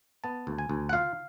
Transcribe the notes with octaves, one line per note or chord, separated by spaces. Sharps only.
B3 A5
D2
G#5
D2
F#5
F4 F5